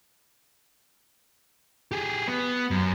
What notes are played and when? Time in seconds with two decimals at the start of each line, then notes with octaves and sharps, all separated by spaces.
1.91 G4 G#4
2.28 B3
2.71 F#2